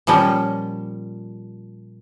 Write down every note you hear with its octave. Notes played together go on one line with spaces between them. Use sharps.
A#2 F3 G3 C#4